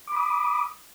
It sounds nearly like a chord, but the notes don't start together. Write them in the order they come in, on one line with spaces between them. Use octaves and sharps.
D6 B5 D#6